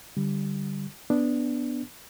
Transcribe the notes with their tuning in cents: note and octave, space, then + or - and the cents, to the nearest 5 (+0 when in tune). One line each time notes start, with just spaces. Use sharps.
D3 +0 G3 +0
B3 +0 D4 +0